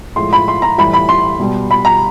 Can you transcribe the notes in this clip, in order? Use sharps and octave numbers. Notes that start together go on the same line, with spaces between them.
A2 F3 G#3 C6
B5
C6
A#5
A2 E3 G3 B5
B5
C6
B2 G3
B5
A#5